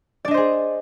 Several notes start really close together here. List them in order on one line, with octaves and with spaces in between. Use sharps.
D5 D4 D#5 C5 G#4